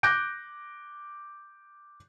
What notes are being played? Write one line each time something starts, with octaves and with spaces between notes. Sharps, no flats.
D6 F#6 G6 A#6 D7